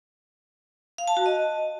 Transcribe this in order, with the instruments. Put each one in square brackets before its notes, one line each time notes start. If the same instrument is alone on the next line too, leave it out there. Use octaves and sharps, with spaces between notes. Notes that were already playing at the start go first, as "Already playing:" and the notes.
[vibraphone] F5
A5
F#4
D#5